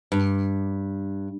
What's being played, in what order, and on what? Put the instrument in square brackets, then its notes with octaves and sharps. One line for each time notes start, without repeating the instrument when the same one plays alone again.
[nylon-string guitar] G2